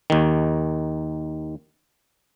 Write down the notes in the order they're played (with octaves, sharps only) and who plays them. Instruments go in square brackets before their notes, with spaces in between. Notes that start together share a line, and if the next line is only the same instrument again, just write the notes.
[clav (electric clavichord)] D#2 D#3